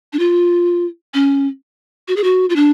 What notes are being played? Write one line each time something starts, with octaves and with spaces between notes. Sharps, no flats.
D4
F4
C#4
F#4
G#4
F#4
F4
D4